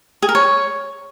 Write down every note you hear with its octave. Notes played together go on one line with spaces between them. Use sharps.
G#4
A#4
C#5